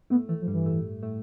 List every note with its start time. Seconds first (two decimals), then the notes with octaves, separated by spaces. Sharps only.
0.10 A2 A3 B3
0.28 A2 E3 A3
0.42 F3
0.47 G2 G3
0.54 E3
0.65 A2 A3
1.03 A2 A3